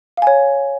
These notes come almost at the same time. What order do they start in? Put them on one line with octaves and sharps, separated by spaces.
F5 G#5 C#5